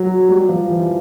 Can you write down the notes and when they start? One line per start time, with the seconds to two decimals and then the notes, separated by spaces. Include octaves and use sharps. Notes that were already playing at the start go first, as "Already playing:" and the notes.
Already playing: F#3
0.29 G3
0.48 F3
0.69 E3